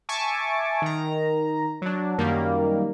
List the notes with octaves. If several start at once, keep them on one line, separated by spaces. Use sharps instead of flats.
E5 G#5 A5 C#6 D6
D#3 A#5
F#3 D4
F#2 D#3 G3 A#3